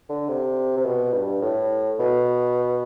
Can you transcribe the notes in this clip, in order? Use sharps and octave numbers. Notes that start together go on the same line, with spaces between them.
D3
C3
C3
B2
G2
A2
B2